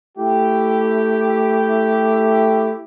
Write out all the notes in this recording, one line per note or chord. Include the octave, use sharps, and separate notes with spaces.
A3 E4 G4